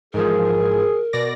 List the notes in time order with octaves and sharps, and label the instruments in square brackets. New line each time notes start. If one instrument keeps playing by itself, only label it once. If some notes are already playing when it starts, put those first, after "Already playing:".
[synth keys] G#2 E3 F3 [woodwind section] G#4 [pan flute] A#4
[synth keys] B2 D5 A#6